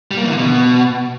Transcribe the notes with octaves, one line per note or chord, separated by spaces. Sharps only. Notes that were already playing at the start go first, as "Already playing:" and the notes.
G3
A#3
E3
D3
B2